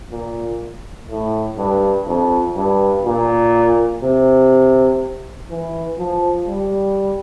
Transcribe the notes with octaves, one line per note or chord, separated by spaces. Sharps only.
A#2
A2
G2
F2
G2
A#2
C3
E3
F3
G3